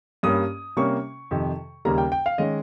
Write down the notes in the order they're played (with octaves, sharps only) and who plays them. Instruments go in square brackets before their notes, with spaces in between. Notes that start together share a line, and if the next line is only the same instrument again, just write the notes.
[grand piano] G2 G3 A#3 C#4 D#6
C3 G3 A#3 C#4 C#6
F2 C3 D#3
D#2 C#3 G3 A#3 A#5
G5
G5
F5
D#3 G#3 C#4 D#5